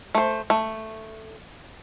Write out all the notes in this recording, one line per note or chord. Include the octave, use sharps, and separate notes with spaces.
A3 C5
A3